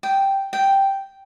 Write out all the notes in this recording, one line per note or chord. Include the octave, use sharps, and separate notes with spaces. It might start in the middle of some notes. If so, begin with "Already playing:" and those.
G5
G5